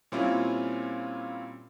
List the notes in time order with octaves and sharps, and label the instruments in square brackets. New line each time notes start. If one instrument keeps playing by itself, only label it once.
[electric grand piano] A#2 G3 C4 C#4 E4 F4